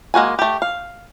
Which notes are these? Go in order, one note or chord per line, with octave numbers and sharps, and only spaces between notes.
G#3 A#3 F#4 G#5
A3 G4
F5